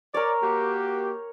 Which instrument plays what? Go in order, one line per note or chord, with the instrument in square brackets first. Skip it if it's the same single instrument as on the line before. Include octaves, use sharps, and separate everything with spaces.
[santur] A#4 C#5 [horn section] D5
[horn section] A#3 F#4 G4